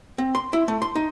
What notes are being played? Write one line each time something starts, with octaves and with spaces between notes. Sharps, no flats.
C4
C6
E4
A3
C6
D#4